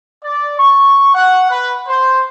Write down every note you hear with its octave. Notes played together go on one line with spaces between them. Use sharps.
D5
C#6
F#5
B4
C5